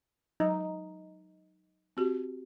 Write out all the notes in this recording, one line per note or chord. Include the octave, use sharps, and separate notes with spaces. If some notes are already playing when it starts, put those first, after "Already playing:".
F#3 D#4
C4 F#4 G4